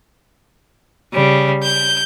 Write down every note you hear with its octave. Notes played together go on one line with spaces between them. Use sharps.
C#3 G3
G6